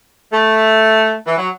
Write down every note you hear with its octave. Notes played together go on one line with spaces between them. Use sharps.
A3
E3
F#3